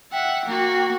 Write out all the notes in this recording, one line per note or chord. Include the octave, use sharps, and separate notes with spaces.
E5 F#5 G5
A#3 F#4